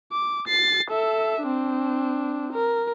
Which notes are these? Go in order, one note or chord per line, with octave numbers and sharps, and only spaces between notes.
D6
A6 C7
A4 E5
C4 D4
A#4